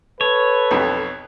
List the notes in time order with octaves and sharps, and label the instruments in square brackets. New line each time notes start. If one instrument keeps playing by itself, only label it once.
[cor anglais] A4 [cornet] B4 [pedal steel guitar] C#5
[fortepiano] B1 F2 B3